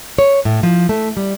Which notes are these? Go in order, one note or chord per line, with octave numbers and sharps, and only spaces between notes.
C#5
A2
F3
A3
G3